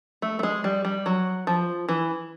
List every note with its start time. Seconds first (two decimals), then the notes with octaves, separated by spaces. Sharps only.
0.22 A3
0.39 A3
0.43 G#3
0.64 G3
0.85 G3
1.06 F#3
1.47 F3
1.89 E3